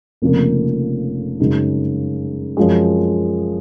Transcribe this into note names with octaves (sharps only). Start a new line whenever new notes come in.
F1 F2 C#3 F3 A#3
F#2 C#3 G#3 D#4
F#2 F3 G#3